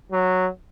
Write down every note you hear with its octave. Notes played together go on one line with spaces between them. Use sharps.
F#3